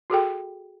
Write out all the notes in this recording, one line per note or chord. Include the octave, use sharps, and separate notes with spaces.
F#4 G#4 A4 G5